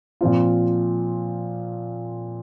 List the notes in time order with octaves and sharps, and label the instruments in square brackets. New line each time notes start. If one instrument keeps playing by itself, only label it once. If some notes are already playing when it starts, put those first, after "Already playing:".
[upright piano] A#2 F3 C4 F4